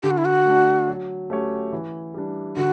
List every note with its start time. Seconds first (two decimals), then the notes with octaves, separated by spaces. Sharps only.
0.03 D3 G4
0.11 F#4
0.18 E4
0.25 F#4
0.45 A3 D4
0.88 F#3
1.30 A3 C#4 G4 C#5
1.73 E3
2.14 G3 D4
2.56 D3 F#4